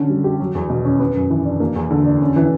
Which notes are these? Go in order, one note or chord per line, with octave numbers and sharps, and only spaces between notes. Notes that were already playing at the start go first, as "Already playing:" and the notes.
Already playing: D3 C#4
G3
G4
F#3
E2
B2
C#4
B3
F#2
E3
D4
A#3
E2
D3
D4
C#4
E3